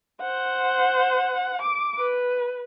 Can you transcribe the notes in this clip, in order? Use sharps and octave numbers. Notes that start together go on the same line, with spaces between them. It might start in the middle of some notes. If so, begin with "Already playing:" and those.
C5 F#5
D6
B4